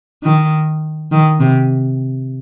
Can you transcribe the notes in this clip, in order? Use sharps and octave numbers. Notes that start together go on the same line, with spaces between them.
D#3
D#3
C3